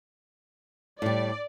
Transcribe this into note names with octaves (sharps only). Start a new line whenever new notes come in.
A2 G3 D5